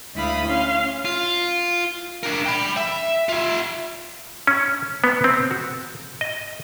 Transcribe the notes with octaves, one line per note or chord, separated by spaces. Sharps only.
D2 A3 E4 F5 B5 D#6
C#4 F5 C6
F4
D4 A#4
G5 B5
E5
F4 E5
C#4
B3
C4
F#4
D#5